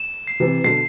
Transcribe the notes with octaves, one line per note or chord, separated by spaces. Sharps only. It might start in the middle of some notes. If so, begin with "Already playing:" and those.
Already playing: E7
C7
C3 E3
B2 D3 C7